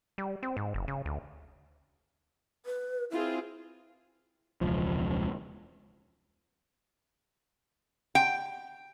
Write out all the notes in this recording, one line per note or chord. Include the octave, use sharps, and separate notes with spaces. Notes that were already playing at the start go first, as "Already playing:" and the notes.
G3
C4
G#2
F#1
C#3
D2
B4
C4 E4 F4 G#4
E1 C#2 F3
G5